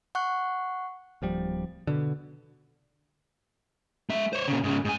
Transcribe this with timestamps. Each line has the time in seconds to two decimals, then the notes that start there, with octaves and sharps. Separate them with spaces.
0.15 F#5 C#6 F#6
1.22 D1 F3 G3
1.87 B2 D3
4.10 G#3 E5
4.33 C5 C#5
4.48 A#2 C#3
4.64 G#2 C#3
4.85 G#2 G#5